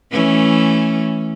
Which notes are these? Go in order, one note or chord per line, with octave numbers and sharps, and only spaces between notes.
E3 A3 C#4